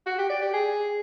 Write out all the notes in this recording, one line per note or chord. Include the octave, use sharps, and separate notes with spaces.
F#4
G4
D5
G4
G#4